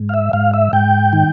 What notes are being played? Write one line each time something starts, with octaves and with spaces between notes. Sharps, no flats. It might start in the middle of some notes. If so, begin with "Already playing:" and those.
Already playing: G#2
F5
E5
G#2 F5
E5
G#2 G5
D#3